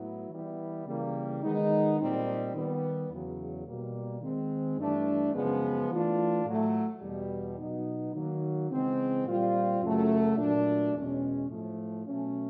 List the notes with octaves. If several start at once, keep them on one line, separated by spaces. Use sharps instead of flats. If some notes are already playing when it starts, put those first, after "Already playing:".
Already playing: A2 F#3 B3 E4
E3 G3 B3 E4
C#3 E3 G3 A#3
D#3 G#3 B3 D#4
A#2 G3 C4 D#4
D#3 G3 B3
E2 C#3 F#3
B2 G3 A#3
D#3 G#3 C4
G2 E3 A3 D4
F#2 C#3 F3 G#3 B3
E3 A3 D4 F4
A2 F#3 A3
E2 B2 G3
B2 F#3 B3 D#4
D#3 F#3 A#3
C#3 E3 G#3 C4
A#2 G3 C4 F4
F#2 C#3 F#3 A3
A#2 F#3 A3 D4
E2 B2 G#3 C#4
A2 F3 A3
B2 F#3 A3 C#4